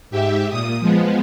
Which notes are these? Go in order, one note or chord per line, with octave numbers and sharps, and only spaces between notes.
G#2 G4 E5
A#2 D#6
F3 G#3 B3